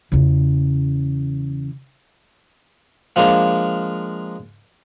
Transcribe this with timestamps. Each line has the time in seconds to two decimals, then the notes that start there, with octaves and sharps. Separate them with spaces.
0.12 E2 C#3
3.16 F3 G#3 A#3 D4